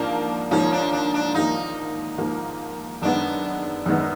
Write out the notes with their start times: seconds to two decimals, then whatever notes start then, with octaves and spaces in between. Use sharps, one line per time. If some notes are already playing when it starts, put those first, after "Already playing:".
Already playing: G#2 F3 A#3 D4
0.51 G#2 F3 A#3 C#4
0.72 D4
0.92 D4
1.14 D4
1.34 G#2 F3 A#3 D#4
2.18 G#2 F3 A#3
3.02 F#2 D#3 G#3 B3 D4
3.86 F#2 D#3 G#3 B3